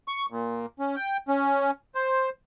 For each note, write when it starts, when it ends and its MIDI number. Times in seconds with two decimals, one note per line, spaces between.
0.08 0.26 85
0.30 0.66 46
0.79 0.96 61
0.96 1.17 79
1.28 1.71 61
1.95 2.30 72